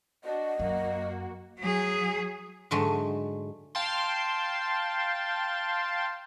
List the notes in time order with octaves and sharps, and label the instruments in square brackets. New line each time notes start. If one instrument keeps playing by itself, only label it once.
[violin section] D4 F#4 [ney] D#5
[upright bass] F#2 [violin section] A#3 F#4
[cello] F#3 G#4
[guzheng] G#2 D3 F#3 G#3 A3
[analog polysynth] F5 G5 A5 C6